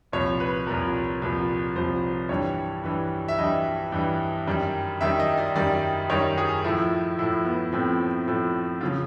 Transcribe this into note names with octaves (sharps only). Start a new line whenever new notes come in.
C2 A#2 F3 C#5
B4
C2 A#2 F3 A#4
C2 A#2 F3
C2 A#2 F3 C5
G2 E3 G3 C#5
G2 E3 G3
E5
G2 E3 G3 D#5
G2 E3 G3
F#2 D#3 G3
F#2 D#3 G3 E5
D#5
D5
F#2 D#3 G3 D5
F#2 D#3 G3 C#5
G#4
A2 F3 E4
A2 F3 E4
B3
A2 F3 C4
A2 F3
C#3 F3 F4